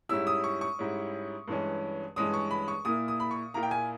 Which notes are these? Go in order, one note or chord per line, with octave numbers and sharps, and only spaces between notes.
G#2 G3 C#4 E4 E6
D#6
C#6
C#6
G#2 G3 C#4 E4
G2 E3 G#3 C#4
G2 E3 G#3 C#4 D#6
C#6
B5
C#6
A#2 A#3 E4 D#6
D#6
B5
C#6
A#2 A#3 E4 A#5
G5
G#5